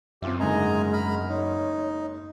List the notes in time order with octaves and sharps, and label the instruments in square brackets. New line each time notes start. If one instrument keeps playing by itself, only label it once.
[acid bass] F#2 [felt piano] C4 F4 E5 [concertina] G4
[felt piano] F#1 D2 G#2 [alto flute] G#3 [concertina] D#5 G#5 A#5
[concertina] A#5 B5 F6
[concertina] D#4 [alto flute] C#5